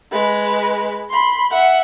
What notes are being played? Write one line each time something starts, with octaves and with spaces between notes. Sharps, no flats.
G#3 B4
B5 C6
E5 F#5